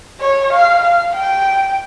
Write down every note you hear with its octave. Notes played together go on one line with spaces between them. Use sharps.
C#5
F5
F5
G5